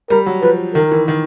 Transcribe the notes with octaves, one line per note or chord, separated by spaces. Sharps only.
G3 A#4
F#3
F3 B4
D#3 A#4
E3
D#3